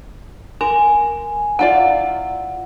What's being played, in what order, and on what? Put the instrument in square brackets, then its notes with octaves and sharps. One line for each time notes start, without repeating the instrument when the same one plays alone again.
[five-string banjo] A#4 [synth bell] G#5
[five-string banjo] E4 F4 D5 [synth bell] F#5